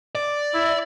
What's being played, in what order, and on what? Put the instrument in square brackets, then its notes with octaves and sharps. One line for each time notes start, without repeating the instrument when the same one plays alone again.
[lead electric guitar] D5
[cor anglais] E4